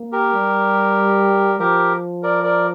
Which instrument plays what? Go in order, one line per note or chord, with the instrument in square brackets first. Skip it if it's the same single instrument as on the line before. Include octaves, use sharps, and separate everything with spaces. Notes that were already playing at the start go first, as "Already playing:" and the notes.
Already playing: [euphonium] A#3
[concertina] G4 A#4
[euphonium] G3
[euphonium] F3 [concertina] G4 A#4
[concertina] A#4 D5
A#4 D5